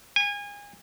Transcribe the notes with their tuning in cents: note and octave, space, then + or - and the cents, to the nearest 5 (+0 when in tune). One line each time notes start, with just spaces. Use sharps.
G#5 -30